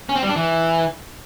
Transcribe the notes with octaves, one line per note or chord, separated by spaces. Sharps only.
C#4
C4
G3
D4
E3